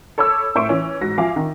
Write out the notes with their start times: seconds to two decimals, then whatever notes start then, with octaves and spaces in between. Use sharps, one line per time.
0.18 A4 C#5 B5 D6 E6
0.55 A2 C5 E5 C#6 D7
0.69 E3 C#4
1.01 G#2 F#4 A#6
1.18 F3 E5 F5 G#5 D6
1.36 D#3